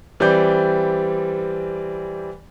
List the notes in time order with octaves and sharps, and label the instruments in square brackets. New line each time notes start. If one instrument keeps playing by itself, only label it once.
[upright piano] E3 G3 C4 D5 G6